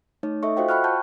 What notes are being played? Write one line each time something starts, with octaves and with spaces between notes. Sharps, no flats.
A3 D#4 C#5
A4 D#5 E5 C#6
F4 F#4 C5 D#5 F5 G5
F#5 G5 B5 C#6 F6 F#6
F#5 A5 C#6 G6